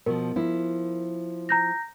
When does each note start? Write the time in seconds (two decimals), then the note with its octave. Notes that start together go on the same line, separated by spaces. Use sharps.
0.06 B2 F3 A#4
0.36 F3 E4
1.49 A#5 G6 A#6